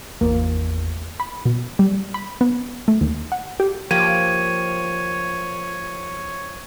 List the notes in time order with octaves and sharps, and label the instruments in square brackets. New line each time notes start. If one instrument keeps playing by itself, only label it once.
[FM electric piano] G#1 E2 [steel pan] A#3
[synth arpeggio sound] B5
B2
G3
B5
B3
A3
D#2
F#5
G4
[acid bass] F3 [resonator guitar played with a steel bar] A#3 G4 [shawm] C#5 [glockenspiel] G#6 D#7